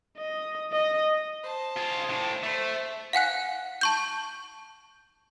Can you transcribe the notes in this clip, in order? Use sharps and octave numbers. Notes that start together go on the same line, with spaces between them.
D#5
D#5
C5 A5
F4 G#4
A2 D4
A3 C5
F5 F#5 G#5 F#6
A5 C#6 G6